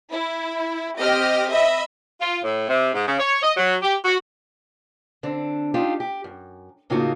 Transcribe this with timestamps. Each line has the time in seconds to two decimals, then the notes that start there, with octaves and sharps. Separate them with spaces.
0.10 E4
0.98 C4 G4 D#5 F6
1.50 D#5 E5 B5
2.21 F4
2.44 A2
2.69 C3
2.94 G#2
3.07 C#3
3.20 C#5
3.43 D#5
3.57 F#3
3.83 G4
4.04 F#4
5.23 D3 C4 D4
5.74 D4 D#4 F4 G4
6.00 G4
6.24 F#2
6.90 A2 C#3 A#3 D#4 F4 F#4